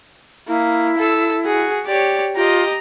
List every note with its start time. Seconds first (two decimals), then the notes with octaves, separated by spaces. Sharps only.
0.48 A#3 E4
0.99 A4 E6
1.45 F#4 G#4
1.87 G4 C#5 D5
2.36 F4 G4 D#5 A#5